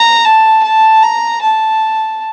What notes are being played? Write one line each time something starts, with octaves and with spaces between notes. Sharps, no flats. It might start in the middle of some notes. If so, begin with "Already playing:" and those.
Already playing: A#5
A5
A5
A#5
A5